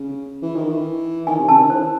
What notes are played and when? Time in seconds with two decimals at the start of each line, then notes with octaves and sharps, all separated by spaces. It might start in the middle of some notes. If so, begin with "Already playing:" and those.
Already playing: C#3
0.42 E3
0.56 D#3
0.70 E3
1.27 D#3 G#5
1.39 C3
1.49 C#3 A5
1.60 D#3
1.70 E3 C5